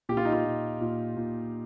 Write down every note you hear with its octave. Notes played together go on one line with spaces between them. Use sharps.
A#2 G4
F4
D#4
F4
A#2
A#2
A#2